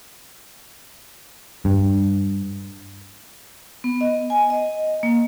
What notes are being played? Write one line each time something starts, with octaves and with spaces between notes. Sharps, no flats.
G2
B3
D#5
G#5
D#5
A#3